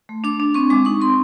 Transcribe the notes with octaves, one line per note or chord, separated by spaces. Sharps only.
A3
D4 D6
D4
C4 C#6
G#3 D6
D#4 C#6
C4 C6